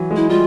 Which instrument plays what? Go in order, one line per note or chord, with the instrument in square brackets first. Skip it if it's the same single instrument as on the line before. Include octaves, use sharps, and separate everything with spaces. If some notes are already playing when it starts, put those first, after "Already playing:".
Already playing: [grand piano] E3 F#3
G#3
[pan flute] E4
[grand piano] G3 [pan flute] F4